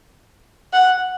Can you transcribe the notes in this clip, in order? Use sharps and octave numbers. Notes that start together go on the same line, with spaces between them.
F#5